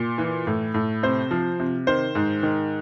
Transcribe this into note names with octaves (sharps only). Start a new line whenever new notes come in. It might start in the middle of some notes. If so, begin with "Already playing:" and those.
Already playing: A#2
E3
A2
A2
C3 C5
F3
C3
D#3 C5
G#2
D#3